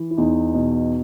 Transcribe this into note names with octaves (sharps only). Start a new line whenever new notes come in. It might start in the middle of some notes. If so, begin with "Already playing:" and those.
Already playing: E3
E4
E2 D#4
B2